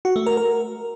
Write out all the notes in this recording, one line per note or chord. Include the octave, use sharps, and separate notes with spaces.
F#4
A3
A#4
A#4